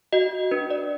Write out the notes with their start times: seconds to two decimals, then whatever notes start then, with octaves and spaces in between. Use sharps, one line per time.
0.13 F#4 D#5
0.51 D4 B4
0.70 D5